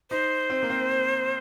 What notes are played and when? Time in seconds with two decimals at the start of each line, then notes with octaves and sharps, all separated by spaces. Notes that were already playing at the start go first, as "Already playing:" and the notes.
0.11 D#4 C5
0.50 C4
0.63 A#3
0.70 C4